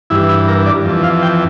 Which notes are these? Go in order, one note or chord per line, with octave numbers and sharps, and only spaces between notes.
G2 E3 E4
E4
A#4
D5
F2 E3
F5
G5